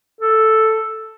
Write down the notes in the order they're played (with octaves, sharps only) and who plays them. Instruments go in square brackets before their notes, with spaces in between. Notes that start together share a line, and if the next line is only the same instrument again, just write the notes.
[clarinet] A4